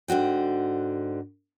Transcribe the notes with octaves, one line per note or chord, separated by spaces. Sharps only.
G#2 D3 F#4 G5